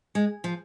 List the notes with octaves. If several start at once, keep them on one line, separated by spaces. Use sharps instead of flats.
G#3
F3